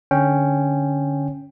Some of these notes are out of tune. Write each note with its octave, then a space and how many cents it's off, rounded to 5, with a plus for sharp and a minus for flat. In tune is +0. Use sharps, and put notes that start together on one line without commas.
D3 +0 C#4 +0 G5 +0